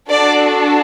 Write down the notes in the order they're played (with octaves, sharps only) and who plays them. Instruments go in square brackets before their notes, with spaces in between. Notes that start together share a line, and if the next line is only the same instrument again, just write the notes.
[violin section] D4 F#4 A4 D5